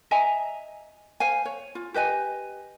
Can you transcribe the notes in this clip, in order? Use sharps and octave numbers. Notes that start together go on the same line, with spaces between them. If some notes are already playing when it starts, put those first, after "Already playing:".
D#5 E5 G#5 A#5
C5 F5 G#5
C#5
F4
G4 B4 D#5 G#5